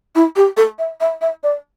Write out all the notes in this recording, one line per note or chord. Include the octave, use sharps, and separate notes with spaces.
E4
G4
A4
E5
E5
E5
D5